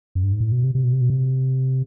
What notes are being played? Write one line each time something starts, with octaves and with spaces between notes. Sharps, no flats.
F#2
G2
G#2
A2
B2
C3
C3
B2
C3
B2
C3